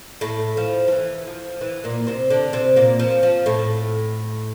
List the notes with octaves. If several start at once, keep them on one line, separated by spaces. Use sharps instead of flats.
A2 A3
F3
F3
E3
F3
E3
A#2 A#3
C3 C4
D3 D4
C3 C4
A#2 A#3
F3
F3
A2 A3